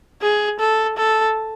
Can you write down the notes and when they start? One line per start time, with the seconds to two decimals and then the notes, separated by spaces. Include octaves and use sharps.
0.22 G#4
0.60 A4
0.98 A4